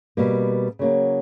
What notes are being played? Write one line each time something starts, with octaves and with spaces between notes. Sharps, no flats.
B2 G3 A#3
C#3 F#3 A#3